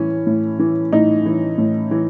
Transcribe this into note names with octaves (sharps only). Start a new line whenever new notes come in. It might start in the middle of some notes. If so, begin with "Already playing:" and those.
Already playing: A2 E3 C#4
A2
E3
A2 D#4
E3
A2
E3